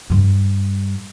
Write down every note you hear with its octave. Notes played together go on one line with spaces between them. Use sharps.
G2 G3